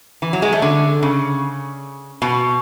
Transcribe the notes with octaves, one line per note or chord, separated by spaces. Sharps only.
E3
F#3
G#3
A3
D3
C#3
B2